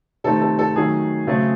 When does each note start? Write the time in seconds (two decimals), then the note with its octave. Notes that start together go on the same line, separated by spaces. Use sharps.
0.24 C3 D#3 A3 C4 A4
0.41 A4
0.59 A4
0.76 D#3 F#3 A3 G#4
1.27 C#3 F#3 A3 C4